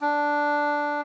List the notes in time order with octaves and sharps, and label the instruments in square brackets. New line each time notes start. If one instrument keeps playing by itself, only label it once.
[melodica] D4